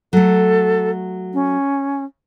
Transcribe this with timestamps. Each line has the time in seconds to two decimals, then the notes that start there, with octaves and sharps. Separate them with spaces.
0.13 F#3 A3 A4
1.34 C#4